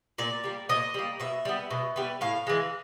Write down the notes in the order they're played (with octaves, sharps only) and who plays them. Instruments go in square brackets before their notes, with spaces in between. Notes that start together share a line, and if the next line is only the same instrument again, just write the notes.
[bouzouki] A#2 D5
G3 A#3
A#2 D#5
G3 A#3
B2 E5
G3 B3
B2
G3 B3
A2 F5
E3 G#3